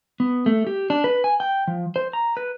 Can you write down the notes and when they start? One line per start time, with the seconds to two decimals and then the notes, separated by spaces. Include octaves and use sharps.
0.20 B3
0.46 A3
0.67 G4
0.90 D4
1.04 B4
1.24 G#5
1.40 G5
1.67 F3
1.96 C5
2.13 A#5
2.37 B4